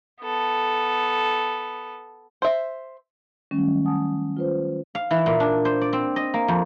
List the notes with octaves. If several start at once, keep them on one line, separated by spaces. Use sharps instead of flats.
B3 A4
C5 E5
D#3 F#3 G3 A3 C#4
F#5 G#5 A5 D#6
F4 B4 C5
F5
E3
A#2
D4
C5
D5
C4
D#5
A#3
F2